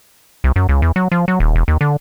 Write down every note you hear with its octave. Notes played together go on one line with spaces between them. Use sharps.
C2
F#2
C#2
E2
F#3
F3
F#3
D#1
E1
D#2
D3